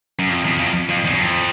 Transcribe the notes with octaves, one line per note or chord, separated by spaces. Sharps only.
F#2
F2
E2
F2
F2
E2
F#2
F2